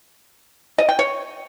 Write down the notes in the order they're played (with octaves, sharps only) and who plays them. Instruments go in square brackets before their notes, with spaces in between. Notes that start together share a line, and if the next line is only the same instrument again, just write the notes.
[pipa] D#5
G5
C#5